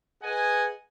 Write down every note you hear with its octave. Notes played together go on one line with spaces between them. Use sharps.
G#4 B4 D#5 F#5 G#5